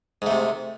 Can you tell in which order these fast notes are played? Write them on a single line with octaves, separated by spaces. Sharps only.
G#2 A3 C3